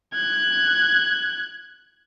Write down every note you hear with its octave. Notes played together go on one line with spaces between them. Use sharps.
F#6 G#6